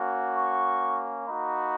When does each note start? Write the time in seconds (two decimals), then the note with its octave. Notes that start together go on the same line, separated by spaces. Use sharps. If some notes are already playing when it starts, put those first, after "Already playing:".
Already playing: A#3 C#4 F#4
0.37 C#6
1.28 A#3 D#4 F#4 B5